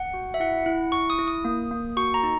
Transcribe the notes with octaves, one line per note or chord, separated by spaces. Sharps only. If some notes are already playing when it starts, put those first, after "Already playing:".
Already playing: F#5
F#4
E5
E4 F#5
E4
E4 C#6
D#6
E4
D#6
A#3
A#3
F#4 C#6
A#5
D#4